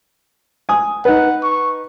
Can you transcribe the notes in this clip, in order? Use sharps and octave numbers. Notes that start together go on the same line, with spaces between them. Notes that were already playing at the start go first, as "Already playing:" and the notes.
G#5 D#6
D#4 B4 F#5
C#6